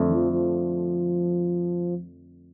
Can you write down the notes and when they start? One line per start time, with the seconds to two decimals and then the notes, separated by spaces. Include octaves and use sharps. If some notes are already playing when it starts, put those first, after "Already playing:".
Already playing: F2 D3 A3
0.09 E3
0.15 F3
0.33 F3